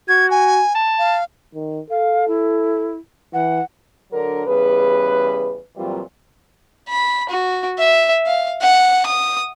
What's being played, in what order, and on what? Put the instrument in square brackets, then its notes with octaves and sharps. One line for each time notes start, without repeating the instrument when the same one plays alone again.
[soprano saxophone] F#4 [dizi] G#6
[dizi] G#5
[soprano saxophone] A5
[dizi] F5
[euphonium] D#3
[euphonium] A4 [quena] F5
[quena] E4
[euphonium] E3 [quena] F#5
[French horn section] D3 F#3 D4 A#4
E2 C#3 G3 B4
A#2 E3 F#3 G3 C4 F4
[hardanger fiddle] B5
F#4
E5
F5
F#5
D#6